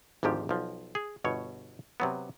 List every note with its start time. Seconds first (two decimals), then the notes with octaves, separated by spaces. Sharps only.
0.23 G#1 D2 G#2 F3 G4
0.49 B1 F3
0.95 G#4
1.24 G1 B2 C#5
2.00 C3 F#3 B3